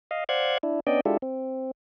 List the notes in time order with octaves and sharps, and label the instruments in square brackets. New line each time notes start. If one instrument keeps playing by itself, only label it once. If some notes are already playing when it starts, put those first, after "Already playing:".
[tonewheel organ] D#5 F5
C5 D5 F5 F#5 F#6 G#6
D4 E4
B3 C#4 D4 D5 D#5 G5
G#3 D4 E4 F4 G4 A4
C4